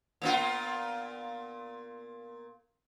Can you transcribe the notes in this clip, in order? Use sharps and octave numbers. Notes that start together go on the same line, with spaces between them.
A#2 B3 F4